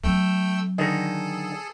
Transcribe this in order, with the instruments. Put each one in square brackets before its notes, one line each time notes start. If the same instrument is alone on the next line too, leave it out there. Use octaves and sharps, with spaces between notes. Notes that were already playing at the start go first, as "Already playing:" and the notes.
[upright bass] F#3 C4 [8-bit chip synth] A3 G5 E6
[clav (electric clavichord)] D3 D#3 D#5 [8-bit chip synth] G#4 A4